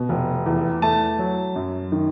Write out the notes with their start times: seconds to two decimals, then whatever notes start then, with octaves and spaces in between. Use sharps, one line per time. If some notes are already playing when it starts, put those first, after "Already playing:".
Already playing: B2
0.09 F1
0.46 E2
0.82 A3 A5
1.19 F#3
1.56 F#2
1.92 D#3